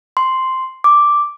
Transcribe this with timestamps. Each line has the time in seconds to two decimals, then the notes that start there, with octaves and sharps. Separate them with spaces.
0.17 C6
0.84 D6